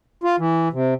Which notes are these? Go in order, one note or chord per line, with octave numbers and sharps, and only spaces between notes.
F4
E3
C3